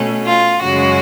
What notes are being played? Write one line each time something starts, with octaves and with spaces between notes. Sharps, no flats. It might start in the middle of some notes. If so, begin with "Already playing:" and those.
Already playing: B2 A3 C#4
F4
F#2 C#3 G#3 C#4 F#4